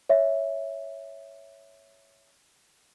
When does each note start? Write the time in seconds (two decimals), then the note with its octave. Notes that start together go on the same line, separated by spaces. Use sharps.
0.09 C#5 E5